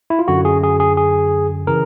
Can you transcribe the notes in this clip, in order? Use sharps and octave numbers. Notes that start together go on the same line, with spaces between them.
E4
F4
F#2 D3 F#4
G#4
G#4
G#4
G#4
C#3 E3 A#4